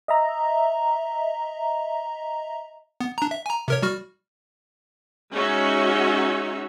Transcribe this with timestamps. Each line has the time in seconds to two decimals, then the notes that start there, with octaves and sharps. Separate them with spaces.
0.08 D#5 E5 A#5
3.00 B3
3.18 D4 A#5
3.31 E5
3.46 G#5 A#5
3.68 C3 A#4 C#5
3.82 G3 F#4 F6
5.33 G#3 C#4 D#4 F#4 C#5 E5